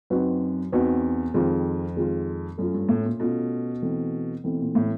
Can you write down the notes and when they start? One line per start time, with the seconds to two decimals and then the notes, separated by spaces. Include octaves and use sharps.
0.10 F#2 C4 D#4 F#4 B4
0.72 E2 C4 D#4 F#4 B4
1.34 F2 D#3 G#3 C4 F4
1.96 D#3 G#3 C4 F4
2.58 F#2 A3 C#4 F4
2.74 G2
2.89 A2
3.05 A#2
3.20 B2 A3 C#4 F4
3.82 E3 A3 C4
4.44 B2 E3 A3 C4
4.59 A#2
4.75 A2